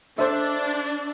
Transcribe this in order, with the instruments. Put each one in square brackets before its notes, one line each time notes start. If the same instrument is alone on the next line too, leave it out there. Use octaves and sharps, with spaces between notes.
[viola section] D4 [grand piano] A4 C5 [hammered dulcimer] E5